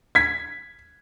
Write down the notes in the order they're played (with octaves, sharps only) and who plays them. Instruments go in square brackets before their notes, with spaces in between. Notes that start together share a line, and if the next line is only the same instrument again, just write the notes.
[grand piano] G#6 B6